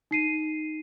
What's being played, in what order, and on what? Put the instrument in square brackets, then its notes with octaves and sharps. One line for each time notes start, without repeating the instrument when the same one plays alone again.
[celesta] D#4 C7 D#7